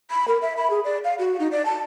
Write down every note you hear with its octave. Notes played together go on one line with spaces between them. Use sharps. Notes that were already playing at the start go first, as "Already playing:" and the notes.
B5
A#4
E5
B5
G#4
D5
F5
F#4
D#4
D5
A5